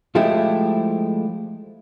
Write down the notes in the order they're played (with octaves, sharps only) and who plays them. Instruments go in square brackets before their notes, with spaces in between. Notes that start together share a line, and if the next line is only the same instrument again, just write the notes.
[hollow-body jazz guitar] F3 G#3 A3 E4 G4